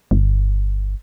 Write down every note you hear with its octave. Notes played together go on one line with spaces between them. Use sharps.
G1